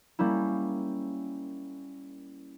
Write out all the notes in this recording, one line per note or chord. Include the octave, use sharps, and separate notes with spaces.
G3 A#3 C#4 E4